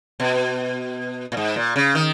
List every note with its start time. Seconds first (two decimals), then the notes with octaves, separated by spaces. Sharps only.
0.20 B2
1.32 A#2
1.37 G#2
1.56 A#2
1.76 C#3
1.95 D#3